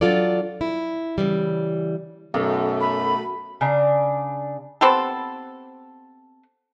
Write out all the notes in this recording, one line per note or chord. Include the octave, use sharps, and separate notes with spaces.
F#3 D4 F4 A4 D5
E4
C#3 E3 G3
B1 F#2 A3
B5
C#3 D4 A#5
B3 C4 G4 A4